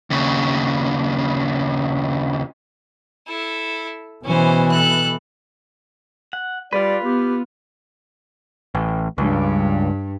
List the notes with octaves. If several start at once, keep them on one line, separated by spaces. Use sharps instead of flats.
D#2 C#3
E4 A4
B2 E3 C#4 C5
A4 F#6
F#5
G3 F4 B4 D5
B3 G4
A1
C#2 G2